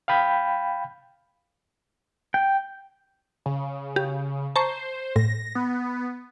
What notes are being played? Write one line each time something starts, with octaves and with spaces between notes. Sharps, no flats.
F5 G5 B5 G6
G5
C#3
G4
C5 A5 A#5 C#6
A2 A#6
B3